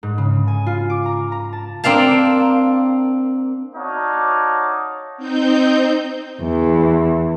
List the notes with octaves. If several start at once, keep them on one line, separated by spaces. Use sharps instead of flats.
G#2
C#3
G#5
F4
D6
A#5
A#5
A5
A#3 C4 D4 F5 A5
D#4 F#4 C#5 D5 F5 A5
C4 D#4 G6
E2